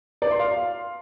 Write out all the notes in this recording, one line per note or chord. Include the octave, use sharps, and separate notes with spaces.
D5
C6
F5